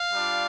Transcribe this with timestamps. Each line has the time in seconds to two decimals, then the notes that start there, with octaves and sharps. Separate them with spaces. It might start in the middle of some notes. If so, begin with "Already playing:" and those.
Already playing: F5
0.13 G3 D4 F4